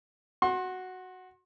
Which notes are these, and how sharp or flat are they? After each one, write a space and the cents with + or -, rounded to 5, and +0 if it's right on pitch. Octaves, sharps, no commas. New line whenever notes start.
F#4 +0 C6 +40